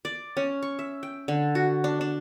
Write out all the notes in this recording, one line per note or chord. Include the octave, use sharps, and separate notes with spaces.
D5
C#4
C#6
E5
G5
D3
F#4
D4
D4